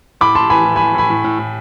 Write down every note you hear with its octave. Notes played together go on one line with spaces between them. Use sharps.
A2 B5 D6
A2 A5 C6
E3 G#5 B5
A2
A2 G#5 B5
A2 G#5 B5
A2
A2
A2